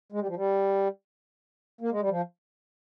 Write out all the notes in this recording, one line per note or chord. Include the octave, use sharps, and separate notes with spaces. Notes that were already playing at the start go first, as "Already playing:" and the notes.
G#3
G3
F3
G3
A#3
G#3
G3
F3